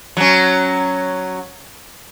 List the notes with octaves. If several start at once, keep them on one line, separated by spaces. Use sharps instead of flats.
F#3 C#4